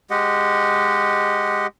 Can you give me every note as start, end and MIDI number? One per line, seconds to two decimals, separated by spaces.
0.10 1.67 56
0.10 1.67 67
0.10 1.67 75
0.10 1.67 78